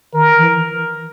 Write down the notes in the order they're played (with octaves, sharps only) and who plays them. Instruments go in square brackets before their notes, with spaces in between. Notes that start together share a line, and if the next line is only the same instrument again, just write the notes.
[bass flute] D#3 [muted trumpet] A#4
[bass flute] E3